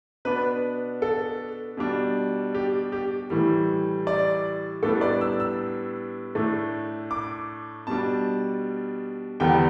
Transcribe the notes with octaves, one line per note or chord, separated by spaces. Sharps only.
B2 B3 D4 B4
A4
B2 G3 D4
G4
G4
A2 E3 G3
D5
A2 G3 B3 D4 A4
D5
E6
E6
A2 A3 D4
D6
B2 G3 D4 A5
E2 D3 G3 B3 G5